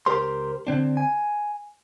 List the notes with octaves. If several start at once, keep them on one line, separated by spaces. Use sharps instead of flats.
C#2 G4 A#4 C5 C6
D3 C4 D4
G#5